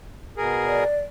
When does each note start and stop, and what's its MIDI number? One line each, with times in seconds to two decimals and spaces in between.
0.37 0.84 47
0.37 0.84 68
0.37 0.84 70
0.66 1.00 74